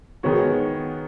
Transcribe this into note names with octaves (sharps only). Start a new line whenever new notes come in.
D#3 G#3 B3 F#4 C#5